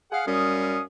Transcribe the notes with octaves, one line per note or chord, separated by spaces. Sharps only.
G#4 F5 F#5
F#2 G3 C#4 F5 D#6